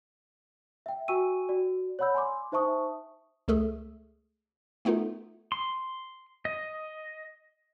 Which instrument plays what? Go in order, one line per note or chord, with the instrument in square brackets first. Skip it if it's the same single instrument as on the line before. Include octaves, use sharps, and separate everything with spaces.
[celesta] E5 G5
F#4 G5 G#5 C#6 E6 D#7
F#4 D5
C#5 D5 F#5 B5 E6 G6
G#5 C6 D6
D#4 C5 E5 A5 C#6 D#6
[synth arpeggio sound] C#2 A3 G#4 A4
A3 B3 D#4 F4 A4
[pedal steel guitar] C6
D#5